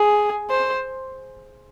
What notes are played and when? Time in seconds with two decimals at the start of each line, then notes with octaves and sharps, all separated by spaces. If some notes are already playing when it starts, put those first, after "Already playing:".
Already playing: G#4
0.50 C5